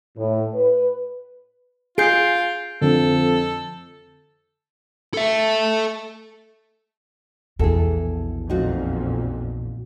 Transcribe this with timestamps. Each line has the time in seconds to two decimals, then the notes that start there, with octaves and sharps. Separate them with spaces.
0.17 A2
0.55 B4
1.98 F4 G#4 G6 C7 D7
2.82 F2 D3 A4
5.14 A4 E5
7.59 A#1 E2 B2 E3 G#4 A4
8.50 F2 A#2 D#4 F4 F#4